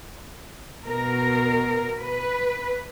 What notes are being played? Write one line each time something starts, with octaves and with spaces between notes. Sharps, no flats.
B2 A#4
B4